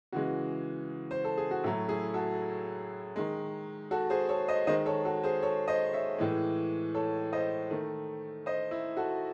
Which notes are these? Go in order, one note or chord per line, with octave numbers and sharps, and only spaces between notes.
C#3 E3 G#3 F#4
C5
A4
G#4
F#4
A2 F#3 A3 E4
E4 G#4
F#4 A4
D#3 G#3
F#4 A4
G#4 C5
A4 C#5
C5 D#5
D#3 G#3 C5 D#5
A4 C#5
F#4 A4
G#4 C5
A4 C#5
C5 D#5
C#5 E5
A2 E3 G#3
A4 C#5
C5 D#5
D#3 A3
C5 D#5
E4
F#4 A4